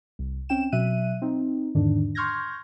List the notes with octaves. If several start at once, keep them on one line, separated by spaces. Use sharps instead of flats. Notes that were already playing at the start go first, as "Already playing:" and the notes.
C2
C4 C#4 G5 E7
B2 F#3 E5 F#6 D#7
C4 D#4
E2 G#2 D3 D#3 D4
C6 C#6 F6 G6 G#6 A#6